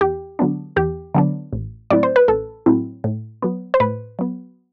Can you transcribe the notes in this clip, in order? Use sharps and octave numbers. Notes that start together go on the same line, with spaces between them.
E2 G4
D3 F#3 B3 D4
E2 G4
D3 F#3 B3 D4
A1
A2 F#3 C4 E4 D5
C5
B4
A1 A4
A2 F#3 C4 E4
A2
F#3 B3
C5
A2 B4
F#3 B3